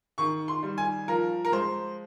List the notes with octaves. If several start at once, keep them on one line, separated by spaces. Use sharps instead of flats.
D#3 C#6
C6
G3
G#5
F3 A#4
A#4
G#3 C5